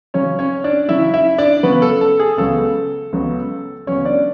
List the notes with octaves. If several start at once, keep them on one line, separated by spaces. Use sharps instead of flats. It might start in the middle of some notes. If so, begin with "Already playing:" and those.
C#3 F#3 C#4 C#5
C#4 C#5
D4 D5
C#3 F#3 C#4 E4 E5
E4 E5
D4 D5
C#3 F#3 B3 C#4 B4
A4
A4
G#4
C#2 C#3 F#3 B3 A4
C#2 C#3 F#3 B3
C#2 C#3 F#3 B3 C#4 C#5
D4 D5